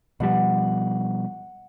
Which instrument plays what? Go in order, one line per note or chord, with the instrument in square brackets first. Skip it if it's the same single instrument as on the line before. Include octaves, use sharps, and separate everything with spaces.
[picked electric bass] B2 F3 G3 [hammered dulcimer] F#5